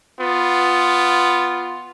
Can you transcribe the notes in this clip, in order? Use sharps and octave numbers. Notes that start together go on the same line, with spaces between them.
B3 F4